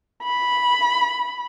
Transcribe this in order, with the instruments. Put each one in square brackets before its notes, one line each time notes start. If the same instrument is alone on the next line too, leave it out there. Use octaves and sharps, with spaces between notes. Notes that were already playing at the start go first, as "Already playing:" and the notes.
[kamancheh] B5